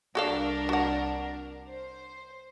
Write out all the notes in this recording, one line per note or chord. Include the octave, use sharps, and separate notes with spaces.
C2 D4 F#4 A4 A#4 F5
F#4 F#5
C5